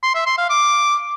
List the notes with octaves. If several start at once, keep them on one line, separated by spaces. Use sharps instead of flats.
C6
E5
C6
F5
D6